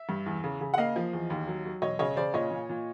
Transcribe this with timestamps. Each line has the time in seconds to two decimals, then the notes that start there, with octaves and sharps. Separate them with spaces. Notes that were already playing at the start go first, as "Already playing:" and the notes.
Already playing: E5
0.09 G2
0.26 E2
0.44 C#3
0.61 C#3
0.74 F#5
0.78 A#3 D#5 F5
0.96 F3
1.13 E2
1.30 D#2
1.47 F#3
1.65 F#3
1.82 E1 C#5 D#5
1.99 C#3 C#5 D#5
2.16 C#3 C5 D5
2.34 A#2 C#5 D#5
2.51 A#2
2.69 A#2